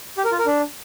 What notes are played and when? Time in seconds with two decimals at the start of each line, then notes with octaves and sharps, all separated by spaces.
0.18 G4
0.25 A#4
0.32 F4
0.39 A#4
0.46 D4